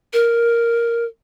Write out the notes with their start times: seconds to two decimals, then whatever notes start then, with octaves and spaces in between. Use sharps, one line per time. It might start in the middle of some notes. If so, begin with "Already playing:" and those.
0.13 A#4